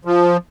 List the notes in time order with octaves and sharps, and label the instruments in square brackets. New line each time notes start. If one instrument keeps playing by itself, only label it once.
[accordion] F3